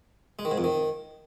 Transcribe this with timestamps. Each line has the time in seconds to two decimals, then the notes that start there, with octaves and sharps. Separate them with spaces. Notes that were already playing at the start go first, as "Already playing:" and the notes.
0.39 G#3
0.45 D#3
0.51 G#2
0.58 F2
0.64 D#3